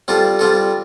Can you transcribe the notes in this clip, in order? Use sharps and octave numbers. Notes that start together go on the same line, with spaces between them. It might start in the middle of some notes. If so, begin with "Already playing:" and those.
G3 C4 F4 A4
G3 C4 F4 A4